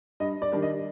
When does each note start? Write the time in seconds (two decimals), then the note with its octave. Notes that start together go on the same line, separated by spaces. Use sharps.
0.20 G2 D#5
0.42 D5
0.52 D#3 G3 D4
0.62 D#5